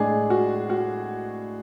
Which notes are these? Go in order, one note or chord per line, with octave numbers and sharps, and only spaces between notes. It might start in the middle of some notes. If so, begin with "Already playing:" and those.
Already playing: A2 G#3 D4 G#4
F#4
F#4